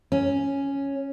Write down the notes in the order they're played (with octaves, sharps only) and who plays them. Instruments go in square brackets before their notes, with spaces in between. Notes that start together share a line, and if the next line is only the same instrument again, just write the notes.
[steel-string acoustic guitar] C#4